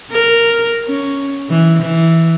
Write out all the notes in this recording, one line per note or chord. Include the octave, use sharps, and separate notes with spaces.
A#4
C#4
E3
E3